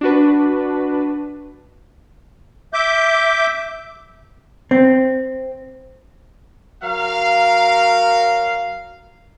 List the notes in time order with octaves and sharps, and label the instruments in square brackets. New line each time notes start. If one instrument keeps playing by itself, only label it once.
[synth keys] D4 F#4 B4
[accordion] E5 D6 G6
[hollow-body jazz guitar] C4
[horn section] F#3 A#4 F5